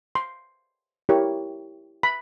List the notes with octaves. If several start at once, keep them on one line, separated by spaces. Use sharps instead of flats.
C6
E4 G4 A#4 C#5
B5